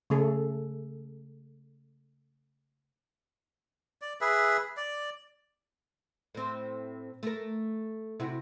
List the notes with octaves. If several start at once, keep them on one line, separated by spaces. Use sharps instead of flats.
C#3 A3 G#4 A4
D5
G#4 B4 E5
D5
A2 C4
A3 A#4
C3 E4 F#4